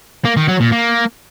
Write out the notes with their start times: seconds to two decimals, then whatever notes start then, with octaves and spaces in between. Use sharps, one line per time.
0.25 A#3
0.37 D#3
0.48 F#3
0.60 A#2
0.72 A#3